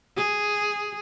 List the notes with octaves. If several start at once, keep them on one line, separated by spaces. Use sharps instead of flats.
G#4